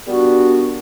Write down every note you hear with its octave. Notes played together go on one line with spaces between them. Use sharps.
A#2 G3 B3 D4 F#4